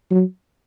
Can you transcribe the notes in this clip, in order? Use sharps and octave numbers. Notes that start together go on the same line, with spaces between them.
F#3